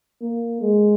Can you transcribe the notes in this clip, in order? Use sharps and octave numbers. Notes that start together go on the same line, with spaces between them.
A#3
G#3